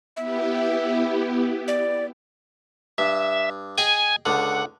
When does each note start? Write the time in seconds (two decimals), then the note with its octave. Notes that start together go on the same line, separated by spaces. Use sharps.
0.17 B3 E4 G4 E5
1.68 D5
2.98 G2 E5
3.78 G#4 D#5 G5 G#5
4.26 C#2 D3 F#5